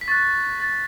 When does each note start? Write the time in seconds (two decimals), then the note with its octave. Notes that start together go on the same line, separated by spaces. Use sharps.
0.01 B6
0.08 C#6 F#6 A6
0.60 A6